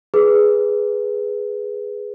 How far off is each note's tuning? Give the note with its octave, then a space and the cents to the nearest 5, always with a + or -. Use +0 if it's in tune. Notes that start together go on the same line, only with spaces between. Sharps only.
G#4 +0 B4 +0